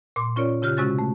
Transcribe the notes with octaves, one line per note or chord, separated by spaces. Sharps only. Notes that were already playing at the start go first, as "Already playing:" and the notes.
A#2 C6 D6
C#4 F4 A#4 C#5 D5
C#3 F4 G4 F6 F#6
C3 G#3 C#4 F#4 F#6 A6
A3